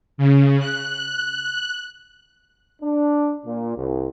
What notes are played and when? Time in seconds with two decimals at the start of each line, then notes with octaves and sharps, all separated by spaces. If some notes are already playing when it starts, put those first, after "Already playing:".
0.18 C#3
0.59 F#6
2.82 D4
3.46 A#2
3.77 C2